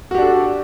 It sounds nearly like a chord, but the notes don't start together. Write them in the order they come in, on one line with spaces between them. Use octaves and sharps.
F#4 G4 D4 A4